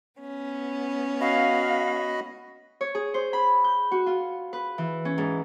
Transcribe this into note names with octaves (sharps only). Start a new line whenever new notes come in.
B3 C#4
F#4 D#5 F5 B5
C#5
G#4
C5
B5
G6
F#4
F4
B4
E3
C#4
G#2